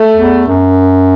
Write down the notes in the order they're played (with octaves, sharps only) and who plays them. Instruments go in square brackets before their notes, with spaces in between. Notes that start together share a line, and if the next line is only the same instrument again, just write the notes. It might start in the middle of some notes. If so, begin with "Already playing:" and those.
Already playing: [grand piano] A3
[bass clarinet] E2
F#2